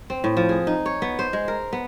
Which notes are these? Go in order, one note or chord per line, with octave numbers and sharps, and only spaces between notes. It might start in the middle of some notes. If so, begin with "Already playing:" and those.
C4
A2
F3
G#4
D#4
C#5
B3
C5
G#3
A#4
B3